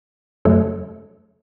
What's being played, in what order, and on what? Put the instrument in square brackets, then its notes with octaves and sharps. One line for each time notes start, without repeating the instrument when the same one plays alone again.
[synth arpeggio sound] F#2 C#3 F#3 A3 A4 C#5